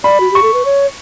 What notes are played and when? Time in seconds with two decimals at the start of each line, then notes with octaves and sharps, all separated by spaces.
0.04 D5 B5
0.20 F#4
0.31 G4 C#6
0.42 A4
0.54 B4
0.65 C#5